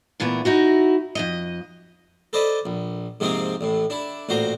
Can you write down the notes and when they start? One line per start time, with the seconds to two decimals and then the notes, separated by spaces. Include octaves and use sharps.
0.20 A#2 E3 A3 B3
0.45 D#4 E4 F#4
1.15 F2 G#2 D#5
2.33 A4 B4 C5 D5 D#5
2.66 A#1
3.20 G#2 C3 F3 G#3 A#3 C4
3.61 A1 A2
3.90 D4 E4
4.29 A1 A#2 F#4 C5 A#5